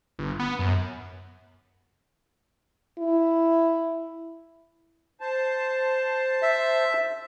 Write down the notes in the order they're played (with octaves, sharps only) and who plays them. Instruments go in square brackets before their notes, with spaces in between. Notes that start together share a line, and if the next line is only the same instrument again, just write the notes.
[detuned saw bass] G1
B3
F#2
[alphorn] E4
[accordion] C5 A5
[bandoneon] E5